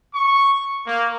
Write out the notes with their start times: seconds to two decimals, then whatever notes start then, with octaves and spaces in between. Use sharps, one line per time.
0.14 C#6
0.87 A#3